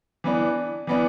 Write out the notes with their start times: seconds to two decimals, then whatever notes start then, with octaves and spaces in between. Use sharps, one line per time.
0.24 E3 B3 D4
0.87 E3 B3 D4